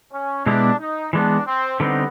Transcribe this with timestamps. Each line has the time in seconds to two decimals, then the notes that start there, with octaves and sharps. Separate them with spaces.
0.13 C#4
0.46 B2 G#3 B3 D4 E4 G4
0.80 D#4
1.13 E3 G#3 B3 D4
1.47 C4
1.80 D3 G3 B3 C4 D#4